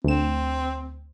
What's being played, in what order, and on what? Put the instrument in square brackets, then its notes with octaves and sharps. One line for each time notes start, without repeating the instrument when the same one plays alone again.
[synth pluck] D2 E7 [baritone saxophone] C4